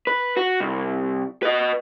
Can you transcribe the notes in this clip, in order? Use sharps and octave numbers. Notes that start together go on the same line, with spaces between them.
B4
F#4
C2
B4 D#5